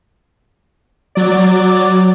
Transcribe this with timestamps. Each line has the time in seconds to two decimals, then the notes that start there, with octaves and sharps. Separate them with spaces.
1.15 F#3 D5